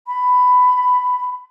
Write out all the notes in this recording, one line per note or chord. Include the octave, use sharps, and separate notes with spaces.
B5